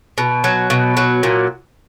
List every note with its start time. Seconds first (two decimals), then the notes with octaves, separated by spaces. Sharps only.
0.18 B2
0.44 F#3
0.70 B2
0.97 F#3
1.23 A#2